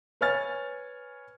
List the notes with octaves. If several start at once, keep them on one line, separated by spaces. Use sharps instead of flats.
B4 C#5 G#5 F6 A6